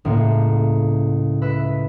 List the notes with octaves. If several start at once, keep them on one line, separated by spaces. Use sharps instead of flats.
C#2 A2 A#3
B4 E5